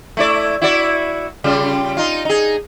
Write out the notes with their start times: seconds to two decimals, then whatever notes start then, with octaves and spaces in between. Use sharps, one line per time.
0.17 A3 E4 D5
0.62 E4 F#4 D5
1.44 C#3 G3 F4
1.97 D#4 F4
2.25 D#4 G#4